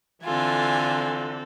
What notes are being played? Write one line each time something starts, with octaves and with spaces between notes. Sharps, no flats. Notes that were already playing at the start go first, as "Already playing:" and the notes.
D3 E3 C4 F4 A4 G#5